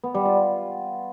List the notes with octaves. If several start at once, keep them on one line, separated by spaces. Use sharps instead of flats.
B3
G3
F4